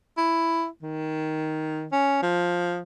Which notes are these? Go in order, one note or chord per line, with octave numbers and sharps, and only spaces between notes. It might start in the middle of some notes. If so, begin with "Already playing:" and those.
E4
D#3
C#4
F3